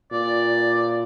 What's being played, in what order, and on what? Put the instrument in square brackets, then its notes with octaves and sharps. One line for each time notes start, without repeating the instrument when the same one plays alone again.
[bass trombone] A#2 [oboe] D5